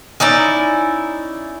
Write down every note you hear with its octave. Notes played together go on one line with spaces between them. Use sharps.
C#4 D#4 E4 D5